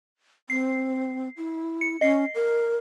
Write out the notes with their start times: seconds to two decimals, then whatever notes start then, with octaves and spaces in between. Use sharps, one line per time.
0.50 C4 C7
1.37 E4
1.81 C#7
2.01 C#4 D#5 C7
2.35 A#4